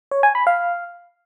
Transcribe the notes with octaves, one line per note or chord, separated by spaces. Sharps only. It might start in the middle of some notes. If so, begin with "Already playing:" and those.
C#5
G#5
B5
F5